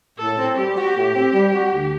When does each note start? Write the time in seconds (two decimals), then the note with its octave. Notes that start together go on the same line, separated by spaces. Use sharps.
0.18 A2 A4
0.38 C4
0.57 G3 G4
0.77 F#4
0.96 A2
1.14 C4
1.33 G3
1.53 F#4
1.73 D2